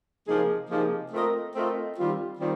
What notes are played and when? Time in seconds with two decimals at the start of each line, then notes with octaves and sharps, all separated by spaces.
0.27 C3 F3 A#3 D#4 G#4
0.69 C3 F3 A#3 D#4 G#4
1.12 A3 C4 F4 A#4 D#5
1.55 A3 C4 F4 A#4 D#5
1.97 D#3 G3 C4 F4
2.39 D#3 G3 C4 F4